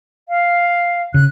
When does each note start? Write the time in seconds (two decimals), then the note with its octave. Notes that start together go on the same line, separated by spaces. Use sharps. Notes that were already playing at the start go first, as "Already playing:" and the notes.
0.29 F5
1.14 C#3 F#6